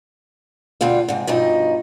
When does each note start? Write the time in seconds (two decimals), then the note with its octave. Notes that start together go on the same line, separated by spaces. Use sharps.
0.81 D2 G2 B2 G3 F4
1.08 G#2 C3
1.27 G2 B2 F3 D#4